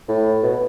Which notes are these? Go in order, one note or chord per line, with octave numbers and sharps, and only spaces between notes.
A2
B2